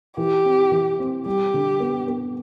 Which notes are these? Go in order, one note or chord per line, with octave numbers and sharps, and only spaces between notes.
E3 G4
C4
E3
C4
G3 G4
D3
B3
B3